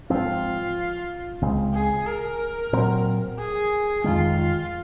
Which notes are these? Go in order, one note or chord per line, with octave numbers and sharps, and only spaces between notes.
G#2 F3 C4 F4
C#2 C#3 G#3 C4
G#4
A#4
A#2 F#3 C4
G#4
F2 D#3 G#3 F4
F4